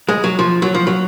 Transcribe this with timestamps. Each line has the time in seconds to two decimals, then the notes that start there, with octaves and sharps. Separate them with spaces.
0.09 G#3
0.24 F#3
0.39 F3
0.62 F#3
0.75 F3
0.87 F#3